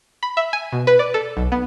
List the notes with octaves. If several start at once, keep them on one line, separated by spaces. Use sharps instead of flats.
B5
E5
G#5
B2
B4
D5
A4
B1
B3